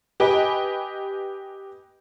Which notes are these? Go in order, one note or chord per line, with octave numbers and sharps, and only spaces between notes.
G4 B4 D#5 G5 G#5